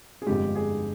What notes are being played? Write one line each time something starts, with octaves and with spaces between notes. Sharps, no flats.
G#4
G1 F2 D3 G#3 G4
G#4